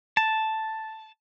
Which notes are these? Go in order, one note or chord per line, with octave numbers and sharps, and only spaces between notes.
A5